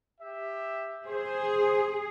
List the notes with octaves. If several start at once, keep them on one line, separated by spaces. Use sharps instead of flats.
G4 E5
G#4 C5